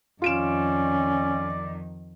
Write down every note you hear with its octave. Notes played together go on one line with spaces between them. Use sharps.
F2 D#3 C#4 F4 D5 D7 E7